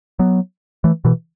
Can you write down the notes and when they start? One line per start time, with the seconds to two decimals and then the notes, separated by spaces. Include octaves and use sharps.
0.19 F#3 B3
0.84 E3 A3
1.05 B2 E3